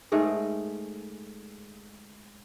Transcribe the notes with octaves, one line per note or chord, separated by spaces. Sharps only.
G#2 A3 G#4 A#4